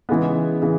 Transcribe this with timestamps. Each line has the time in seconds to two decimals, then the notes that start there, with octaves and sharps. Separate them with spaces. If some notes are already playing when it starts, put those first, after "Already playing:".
0.09 C#3 E3 G#3 B3
0.62 C#3 E3